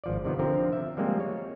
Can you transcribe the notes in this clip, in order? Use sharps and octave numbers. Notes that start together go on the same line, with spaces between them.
G#1 F3 D5
C3 D#3 F3 B3
D3 F3 C4 A#4
E5
F3 G3 G#3 A#3 C4
C#5